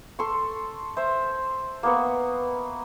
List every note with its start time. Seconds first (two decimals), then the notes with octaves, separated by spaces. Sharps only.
0.19 A4 C6 C#6
0.97 C5 E5
1.83 A#3 B3 C#6